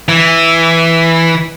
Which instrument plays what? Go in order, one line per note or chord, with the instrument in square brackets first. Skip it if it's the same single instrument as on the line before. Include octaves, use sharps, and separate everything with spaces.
[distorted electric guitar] E3